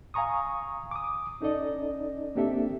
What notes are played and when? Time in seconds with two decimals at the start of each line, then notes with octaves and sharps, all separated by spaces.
0.14 F5 G#5 A#5 C#6 D#6
0.91 D6 D#6
1.41 C#4 D#4 A4 D5 D#5
2.35 A#3 C4 D4 G4 A4 E5